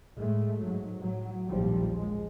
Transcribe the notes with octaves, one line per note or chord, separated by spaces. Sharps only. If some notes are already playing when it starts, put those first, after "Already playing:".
A2 G#3 A3
G#2 F#3
A2 F#3
A#1 D#2 G#2 F3 G3
G#3